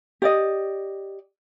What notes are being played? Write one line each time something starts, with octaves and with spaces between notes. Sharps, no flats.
G4 D5 D#5